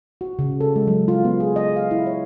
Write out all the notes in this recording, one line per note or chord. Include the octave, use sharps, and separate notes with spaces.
F#4
C#3
A4
G#3
F#3
F4
B3
G#4
D#5
F5
E4
C#5